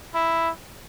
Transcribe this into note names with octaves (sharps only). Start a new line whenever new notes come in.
E4